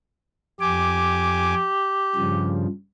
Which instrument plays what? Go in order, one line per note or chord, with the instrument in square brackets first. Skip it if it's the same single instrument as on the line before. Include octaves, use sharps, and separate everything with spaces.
[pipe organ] F2 G#5 D6 [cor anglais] G4
[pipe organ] G2 C#3 F3